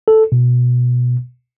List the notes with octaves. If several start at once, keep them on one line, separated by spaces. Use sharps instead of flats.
A4
B2